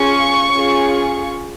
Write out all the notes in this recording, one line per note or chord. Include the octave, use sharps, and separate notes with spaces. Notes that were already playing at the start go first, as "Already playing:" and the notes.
Already playing: C#4 F4 G#4 C#6
C#4 F4 G#4